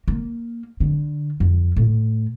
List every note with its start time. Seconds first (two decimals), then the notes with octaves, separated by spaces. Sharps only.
0.08 A#3
0.80 D3
1.40 F2
1.76 A2